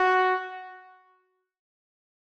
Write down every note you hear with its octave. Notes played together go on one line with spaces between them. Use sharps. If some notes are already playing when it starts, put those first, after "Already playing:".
Already playing: F#4